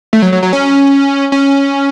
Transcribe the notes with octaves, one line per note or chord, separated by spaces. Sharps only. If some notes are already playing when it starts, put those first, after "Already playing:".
A3
F#3
F#3
F#3
C#4
C#4